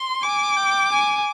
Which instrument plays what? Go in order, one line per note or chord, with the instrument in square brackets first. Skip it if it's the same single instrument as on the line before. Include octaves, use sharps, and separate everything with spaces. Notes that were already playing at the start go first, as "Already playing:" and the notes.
Already playing: [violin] C6
[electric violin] G#5 [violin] D6
[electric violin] G5
G#5